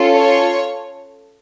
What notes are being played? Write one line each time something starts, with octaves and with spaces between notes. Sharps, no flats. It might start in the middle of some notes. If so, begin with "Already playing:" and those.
Already playing: C#4 F4 A4
C#5